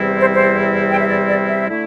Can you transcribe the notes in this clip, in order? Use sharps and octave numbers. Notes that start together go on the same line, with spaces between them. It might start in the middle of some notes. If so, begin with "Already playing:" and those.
Already playing: E2 C3 G3 C4 E4
C5
C5
G5
E5
D5
D5
E5
D3 A3 E4